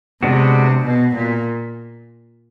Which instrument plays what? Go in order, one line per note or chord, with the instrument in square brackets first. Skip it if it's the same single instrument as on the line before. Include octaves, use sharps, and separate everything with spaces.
[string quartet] C3 [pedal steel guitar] G#3 B3 D4 F#4
[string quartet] B2
A#2